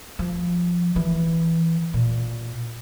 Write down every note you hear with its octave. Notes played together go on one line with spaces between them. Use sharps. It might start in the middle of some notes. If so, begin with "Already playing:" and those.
F3
E3
A#2